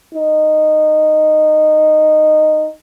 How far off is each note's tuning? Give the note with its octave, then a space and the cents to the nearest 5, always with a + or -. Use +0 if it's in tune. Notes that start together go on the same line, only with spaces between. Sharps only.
D#4 -10